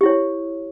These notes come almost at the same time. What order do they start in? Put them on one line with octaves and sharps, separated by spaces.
G4 E4 C#5